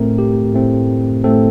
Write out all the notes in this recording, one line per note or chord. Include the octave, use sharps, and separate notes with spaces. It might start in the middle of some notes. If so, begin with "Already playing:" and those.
Already playing: A2 A3 C4 A#4
G4
A2 A3 C4
A2 A3 C4 A4